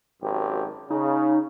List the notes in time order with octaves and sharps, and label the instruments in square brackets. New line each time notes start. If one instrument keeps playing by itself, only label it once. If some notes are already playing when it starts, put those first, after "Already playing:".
[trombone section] G#1 F#2 G4
[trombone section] C#3 [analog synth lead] D#4